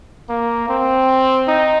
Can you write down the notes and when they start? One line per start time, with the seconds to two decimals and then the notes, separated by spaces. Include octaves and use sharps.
0.29 A#3
0.69 C4
1.47 D#4